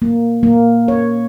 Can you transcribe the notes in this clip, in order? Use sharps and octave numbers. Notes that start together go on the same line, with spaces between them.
A#3
A#3
C#5